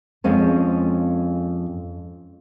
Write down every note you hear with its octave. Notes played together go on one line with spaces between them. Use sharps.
F2 G#3 C#4 A5